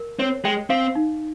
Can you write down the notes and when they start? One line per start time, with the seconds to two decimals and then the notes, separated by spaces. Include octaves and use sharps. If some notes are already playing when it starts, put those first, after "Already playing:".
Already playing: A#4
0.19 C4 C#5
0.45 G#3 G5
0.70 C4 F5
0.95 D#4